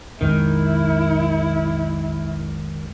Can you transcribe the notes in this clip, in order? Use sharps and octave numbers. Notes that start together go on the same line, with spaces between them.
B1 F2 D#3 G#3 E4